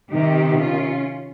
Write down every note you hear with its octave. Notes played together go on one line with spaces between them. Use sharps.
C3 D#3 D#4 G4
C#4 F4